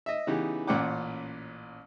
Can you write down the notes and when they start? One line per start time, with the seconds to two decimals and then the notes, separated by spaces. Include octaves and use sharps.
0.06 D#5 E5
0.27 C#3 E3 B3 D#4 E4 G4
0.68 A1 A#2 C#4 F#5 G5 D6